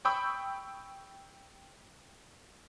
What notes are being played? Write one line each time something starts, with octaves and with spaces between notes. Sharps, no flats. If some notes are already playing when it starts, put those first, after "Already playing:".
G5 B5 C#6 D#6 E6 G6